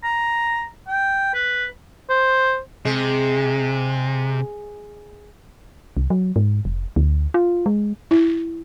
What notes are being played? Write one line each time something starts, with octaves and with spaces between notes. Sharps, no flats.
A#5
G5
B4
C5
C3 G#3
C2
F#3
G#2
F1
D2
F4
G#3
E4